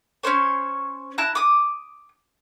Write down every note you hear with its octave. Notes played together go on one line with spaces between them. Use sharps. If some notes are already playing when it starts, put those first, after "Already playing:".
C#4 D4 C5 C#5
E4 A5 A#5 F#6
D6 D#6